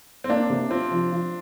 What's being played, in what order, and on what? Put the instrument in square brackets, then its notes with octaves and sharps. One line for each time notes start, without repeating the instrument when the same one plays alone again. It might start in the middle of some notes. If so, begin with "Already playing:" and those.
[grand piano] C4
[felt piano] A#3 [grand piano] D4
[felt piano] C3
[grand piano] C4 [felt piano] F4
[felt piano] F3
F3